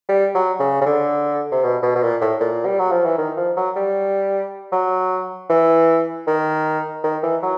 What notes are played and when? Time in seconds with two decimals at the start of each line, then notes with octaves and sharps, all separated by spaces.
0.09 G3
0.35 F#3
0.60 C#3
0.81 C#3
0.86 D3
1.52 C3
1.63 B2
1.83 B2
1.95 B2
2.03 A#2
2.21 A2
2.41 A#2
2.66 G3
2.79 F#3
2.92 F3
3.05 E3
3.18 D#3
3.37 F3
3.57 F#3
3.76 G3
4.72 F#3
5.50 E3
6.27 D#3
7.04 D#3
7.23 E3
7.43 F#3